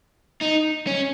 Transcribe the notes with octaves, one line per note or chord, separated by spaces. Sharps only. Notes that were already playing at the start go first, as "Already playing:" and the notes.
D#4
C#4